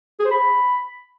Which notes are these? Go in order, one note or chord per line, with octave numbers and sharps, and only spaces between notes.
G#4
C5
B5